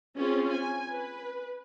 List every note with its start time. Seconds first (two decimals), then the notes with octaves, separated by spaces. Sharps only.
0.17 C4 C#4 F4 G#4
0.53 G#5
0.91 B4